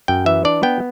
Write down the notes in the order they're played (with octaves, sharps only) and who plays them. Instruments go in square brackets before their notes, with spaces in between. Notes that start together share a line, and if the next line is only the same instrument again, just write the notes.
[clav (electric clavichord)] F#2 G5
E3 E5
D4 D5
B3 G5